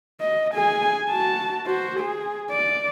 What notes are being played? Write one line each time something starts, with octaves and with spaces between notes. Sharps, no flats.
D#5
G#4 G#5
F#4 A5
F#4 C5
G#4
D5